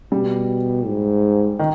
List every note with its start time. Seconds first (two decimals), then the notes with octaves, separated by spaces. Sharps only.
0.12 B2 G3
0.86 G#2
1.59 D#3